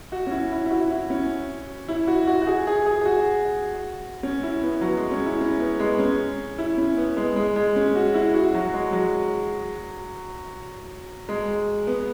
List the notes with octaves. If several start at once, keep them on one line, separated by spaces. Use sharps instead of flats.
F#4
C#4
E4
E4
E4
F#4
E4
C#4
E4
F#4
F#4
F#4
G#4
G#4
G#4
G#4
F#4
C#4
E4
B3
F#3
G#3
C#4
E4
C#4
B3
G#3
C#4
E4
C#4
B3
G#3
G#3
G#3
C#4
F#4
E4
F#4
F#3
G#3
F#3
G#3
B3